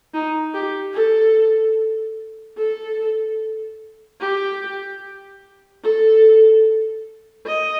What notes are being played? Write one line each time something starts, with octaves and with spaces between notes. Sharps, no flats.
D#4
G4
A4
A4
G4
A4
D#5